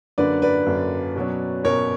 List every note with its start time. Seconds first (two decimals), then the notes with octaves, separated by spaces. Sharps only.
0.18 F#2 D3 A#3 D4 B4 D5
0.42 B4 D5
0.66 F#2 D3 A#3 D4
1.16 B2 F#3 C#4
1.64 B2 F#3 C#4 A#4 C#5